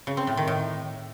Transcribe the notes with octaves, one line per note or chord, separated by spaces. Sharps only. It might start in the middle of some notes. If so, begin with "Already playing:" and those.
C#3
C4
A2
D#3
A2